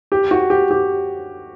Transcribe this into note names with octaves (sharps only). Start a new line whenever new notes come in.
G4
F#4
G4
G4